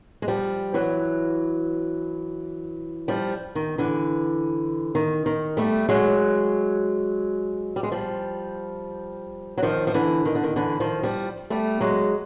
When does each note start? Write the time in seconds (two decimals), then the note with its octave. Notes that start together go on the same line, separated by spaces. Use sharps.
0.22 G#3
0.28 F3 G3
0.74 E3 F#3
3.08 F3 G3
3.55 D#3
3.78 D3 E3
4.95 D#3
5.26 D#3
5.57 G3 A3
5.89 F#3 G#3
7.76 G3
7.83 G#3
7.92 F3 G3
9.58 F#3
9.62 D#3 F3
9.87 F3
9.94 D3 E3
10.25 D#3
10.35 D3
10.44 D#3
10.56 D3 E3
10.80 D#3 F3
11.03 F3 G3
11.50 G3 A3
11.81 F#3 G#3